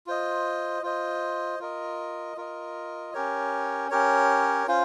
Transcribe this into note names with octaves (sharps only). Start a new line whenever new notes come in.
F4 C5 D#5
F4 C5 D#5
F4 A#4 D#5
F4 A#4 D#5
C#4 G4 A#4 C#5
C#4 G4 A#4 C#5
C#4 F4 C5 F5